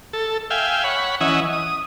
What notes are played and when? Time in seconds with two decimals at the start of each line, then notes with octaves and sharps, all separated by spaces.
0.13 A4
0.50 E5 F5 G5 G#5
0.84 C#5 F#5 B5
1.21 E3 C#4 D#5 E5 F#5 G#5
1.53 D#6